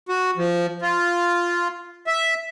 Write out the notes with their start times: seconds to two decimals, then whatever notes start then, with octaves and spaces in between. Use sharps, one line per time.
0.09 F#4
0.37 F3
0.82 F4
2.07 E5